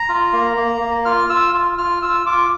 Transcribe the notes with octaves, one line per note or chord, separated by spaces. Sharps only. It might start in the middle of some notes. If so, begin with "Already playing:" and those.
Already playing: A#5
F4
A#3
A#3
A#3
F4 F6
F4 E6
F4
F4 F6
F4 E6
F4 D6